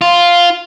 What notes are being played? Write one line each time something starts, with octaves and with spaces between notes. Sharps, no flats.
F4